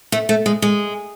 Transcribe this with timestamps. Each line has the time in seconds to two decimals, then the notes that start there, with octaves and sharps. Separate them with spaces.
0.12 A3
0.29 A3
0.46 G#3
0.62 G#3